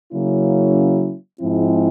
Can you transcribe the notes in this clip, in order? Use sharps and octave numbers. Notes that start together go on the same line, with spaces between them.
C#3 F#3 A#3 C#4 E4
G#2 F3 G#3 C4 E4